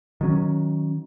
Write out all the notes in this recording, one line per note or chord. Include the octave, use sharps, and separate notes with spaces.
D#3 F#3 C#4